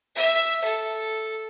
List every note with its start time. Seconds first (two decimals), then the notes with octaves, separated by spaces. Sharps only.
0.16 E5
0.64 A4